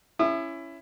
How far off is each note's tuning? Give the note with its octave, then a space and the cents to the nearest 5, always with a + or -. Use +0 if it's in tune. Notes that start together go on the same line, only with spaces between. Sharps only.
C#4 +0 E4 +15 D#6 -45